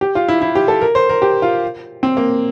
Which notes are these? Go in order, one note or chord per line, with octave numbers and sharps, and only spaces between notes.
G4
F4
E4
E4
G4
A4
A#4
C5
A#4
G4
F4
C4
A#3